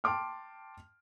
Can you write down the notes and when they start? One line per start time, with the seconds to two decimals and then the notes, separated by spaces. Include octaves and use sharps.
0.04 G5 A5 C6 D6 F6